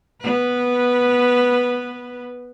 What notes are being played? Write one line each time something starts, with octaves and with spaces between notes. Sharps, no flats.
B3 B4